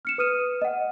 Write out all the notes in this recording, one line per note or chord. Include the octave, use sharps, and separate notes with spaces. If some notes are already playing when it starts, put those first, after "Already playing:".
F6 C#7 E7
B4 D#6 F6 D#7 E7
D#5 F#5